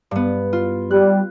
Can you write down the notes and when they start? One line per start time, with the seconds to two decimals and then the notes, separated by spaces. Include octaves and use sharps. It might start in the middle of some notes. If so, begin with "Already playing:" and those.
0.11 G2 B3
0.53 F4
0.91 G3 F#6